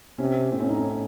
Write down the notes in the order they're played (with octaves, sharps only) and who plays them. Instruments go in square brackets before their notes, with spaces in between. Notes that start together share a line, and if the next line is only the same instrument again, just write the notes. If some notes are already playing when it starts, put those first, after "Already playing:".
[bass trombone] C3 [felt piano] C#4
[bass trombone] A2 [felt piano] C4
[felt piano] C#4
D#4
C#4